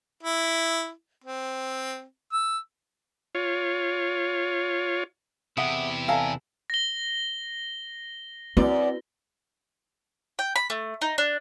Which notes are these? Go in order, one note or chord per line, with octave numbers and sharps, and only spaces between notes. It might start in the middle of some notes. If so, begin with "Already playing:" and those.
E4
C4
E6
F4 C#5
E2 C3 E4 G#4 E5 F#5 D#6
A4 D5 E5 F5 G#5 A#5
A#6 G7
F#2 C4 E4 F#4 B4 D5
G5
B5
A3
D#4
D4